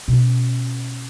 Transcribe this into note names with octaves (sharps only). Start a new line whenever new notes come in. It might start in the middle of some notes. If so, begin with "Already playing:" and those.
B2 C#4